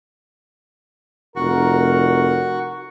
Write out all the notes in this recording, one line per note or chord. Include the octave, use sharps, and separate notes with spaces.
F1 F#4 A#4